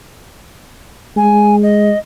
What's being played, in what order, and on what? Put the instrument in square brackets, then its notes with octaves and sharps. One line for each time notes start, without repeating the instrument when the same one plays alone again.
[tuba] G#3 [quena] G#5
[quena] D#5